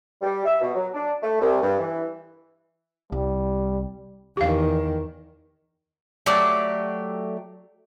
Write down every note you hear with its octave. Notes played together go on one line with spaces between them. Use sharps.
G3
E5
B2
F#3
D4
A3
C2
G2
E3
C2 G3
E2 D#3 G4 F5
F#3 A3 G4 D5